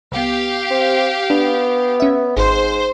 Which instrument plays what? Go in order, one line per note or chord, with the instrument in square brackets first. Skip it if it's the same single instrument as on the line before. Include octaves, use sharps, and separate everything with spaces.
[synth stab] C2 B3 [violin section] G4 F5
[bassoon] C4
[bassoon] B3 [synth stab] D4
[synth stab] C#4 E5
[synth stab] G#1 [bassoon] G#2 [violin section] C5